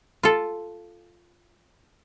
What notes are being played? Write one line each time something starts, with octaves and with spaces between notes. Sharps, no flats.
F4 A4